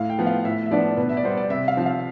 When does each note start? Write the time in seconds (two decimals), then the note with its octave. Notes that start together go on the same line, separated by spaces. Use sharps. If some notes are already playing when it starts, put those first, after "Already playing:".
Already playing: A2 F5
0.10 G5
0.19 F3 B3
0.27 F5
0.44 A2 E5
0.66 E5
0.71 F3 B3 D4 D5
0.97 B2 B4
1.09 E5
1.17 D5
1.24 G3 B3 C5
1.37 D5
1.50 C3 E5
1.68 F5
1.77 F3 C4
1.86 F5